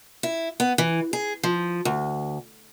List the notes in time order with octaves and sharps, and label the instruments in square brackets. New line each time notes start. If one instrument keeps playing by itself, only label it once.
[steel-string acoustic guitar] E4
B3
E3
G#4
F3
D2